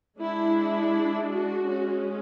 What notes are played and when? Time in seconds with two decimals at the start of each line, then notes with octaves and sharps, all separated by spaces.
0.19 G#3 D4 E4
1.30 F#4
1.67 G#3 C#4